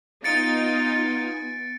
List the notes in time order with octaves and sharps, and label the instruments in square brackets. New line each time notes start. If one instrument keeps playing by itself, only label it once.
[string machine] B3 G#5 [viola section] D#4 F4 [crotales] A6 C#7 D7